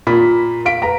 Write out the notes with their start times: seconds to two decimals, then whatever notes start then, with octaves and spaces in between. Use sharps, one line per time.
0.07 A#2 A#4 B5 B6
0.65 F5 B6 D7
0.82 B4 A#5